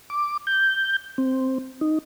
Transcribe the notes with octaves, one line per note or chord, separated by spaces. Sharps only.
D6
G6
C4
D#4